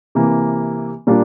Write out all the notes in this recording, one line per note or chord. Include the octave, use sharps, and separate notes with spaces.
C3 E3 A#3
A#2 G3 A#3 D4 F4